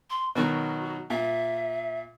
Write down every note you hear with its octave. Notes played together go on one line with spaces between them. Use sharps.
C6
B2 D#3 F#3 F#4
A#2 E5